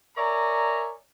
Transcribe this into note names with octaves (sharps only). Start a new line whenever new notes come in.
A#4 C#5 D5 E5 G#5 A#5